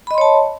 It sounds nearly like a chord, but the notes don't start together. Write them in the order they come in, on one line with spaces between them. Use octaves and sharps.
B5 D#5 C6 C#5 A5